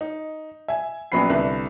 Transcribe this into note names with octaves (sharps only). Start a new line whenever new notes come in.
D#4
E5 G#5
A#1 F#3 B3 C#4 B5 C7
C2 D3 B4